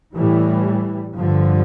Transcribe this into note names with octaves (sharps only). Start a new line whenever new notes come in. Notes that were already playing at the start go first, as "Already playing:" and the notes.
A2 E3 G3
G2 D3 F3